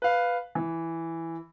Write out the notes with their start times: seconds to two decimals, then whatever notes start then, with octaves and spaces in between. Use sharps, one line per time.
0.02 B4 F5
0.55 E3